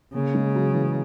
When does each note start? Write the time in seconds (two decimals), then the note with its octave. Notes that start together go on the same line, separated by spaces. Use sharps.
0.14 C#3 A#3
0.35 G#3
0.55 F#3
0.74 E3